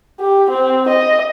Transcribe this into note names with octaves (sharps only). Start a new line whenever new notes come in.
G4
C4
D#5